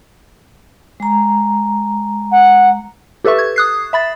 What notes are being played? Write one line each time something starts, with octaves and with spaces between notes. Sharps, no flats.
G#3 A#5
F#5
G4 A4 B4 E5 C#6
G#6
D#6 F#6 C7
E5 B5 A6